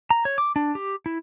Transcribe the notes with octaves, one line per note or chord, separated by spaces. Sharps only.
A#5
C#5
D6
D4
G4
E4